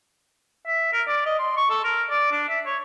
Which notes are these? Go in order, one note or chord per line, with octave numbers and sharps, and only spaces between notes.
E5
A#4
D5
D#5
C6
C#6
A4
A#4
D5
D4
E5
C#5